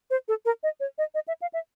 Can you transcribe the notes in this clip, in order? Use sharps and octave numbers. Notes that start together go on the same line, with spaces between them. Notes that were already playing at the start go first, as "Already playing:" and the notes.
C5
A4
A#4
D#5
C#5
D#5
D#5
E5
F5
E5